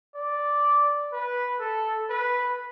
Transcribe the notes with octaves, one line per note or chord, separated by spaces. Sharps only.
D5
B4
A4
B4